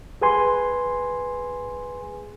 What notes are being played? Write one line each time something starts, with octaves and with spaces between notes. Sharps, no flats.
G#4 B4 G#5 C6